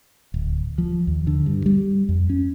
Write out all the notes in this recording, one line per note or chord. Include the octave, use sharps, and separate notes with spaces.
D1
F3
D#2
D3
G2
G3
F2
C#4